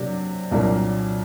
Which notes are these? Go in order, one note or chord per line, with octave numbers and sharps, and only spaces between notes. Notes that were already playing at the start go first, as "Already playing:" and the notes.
Already playing: C3 F#3 A#3 D4
C2 A#2 F#3 A#3 D4